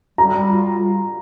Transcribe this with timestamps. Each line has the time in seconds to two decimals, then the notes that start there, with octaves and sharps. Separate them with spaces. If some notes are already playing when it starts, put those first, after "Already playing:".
0.18 G3 A#5
0.50 F4